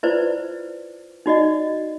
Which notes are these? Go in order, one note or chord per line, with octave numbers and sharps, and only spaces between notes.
E4 F4 B4 C5 D5
D#4 F#4 D5 D#5